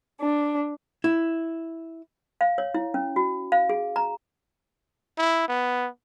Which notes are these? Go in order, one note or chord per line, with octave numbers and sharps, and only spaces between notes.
D4
E4
F5
C#5
E4
C#4
F#4
F5
G#4
A#5
E4
B3